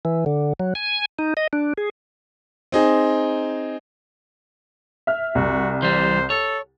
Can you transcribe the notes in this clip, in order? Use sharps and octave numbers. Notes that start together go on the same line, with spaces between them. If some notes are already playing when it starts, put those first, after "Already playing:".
E3
D3
F#3
G#5
D#4
D#5
D4
G#4
C4 D#4 G#4
E5 F6
C2 F#4
E3 G3 C5
A4 C#5